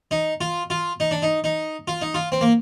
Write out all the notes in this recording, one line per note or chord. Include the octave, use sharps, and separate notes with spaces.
D#4
F4
F4
D#4
D4
D#4
D#4
F4
D#4
F4
C4
A#3